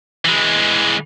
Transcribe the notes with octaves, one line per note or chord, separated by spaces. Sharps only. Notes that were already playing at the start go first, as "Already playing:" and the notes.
E3 G#3